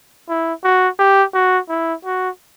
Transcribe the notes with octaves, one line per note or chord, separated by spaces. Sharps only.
E4
F#4
G4
F#4
E4
F#4